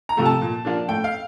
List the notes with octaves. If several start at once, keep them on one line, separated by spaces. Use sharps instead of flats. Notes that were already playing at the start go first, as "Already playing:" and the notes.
A#5
C3 F3 A3
A5
A#2
F3 A#3 D4
A2 G5
F5